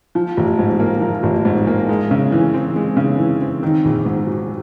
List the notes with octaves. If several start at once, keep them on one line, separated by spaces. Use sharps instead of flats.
F3
A1
G#2
A#3
F3
A1
G#2
A#3
G#3
C#3
E3
C4
G#3
C#3
E3
C4
D#3
A#1
G#2
F#3